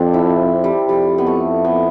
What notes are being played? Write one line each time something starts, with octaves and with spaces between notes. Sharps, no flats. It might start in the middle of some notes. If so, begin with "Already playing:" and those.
Already playing: F2 C4 D4
E4
G3
F2 G3
B3
A3
B3